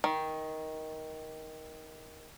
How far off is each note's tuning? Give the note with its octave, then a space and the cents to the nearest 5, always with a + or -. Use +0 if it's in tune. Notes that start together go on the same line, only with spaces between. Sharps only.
D#3 +15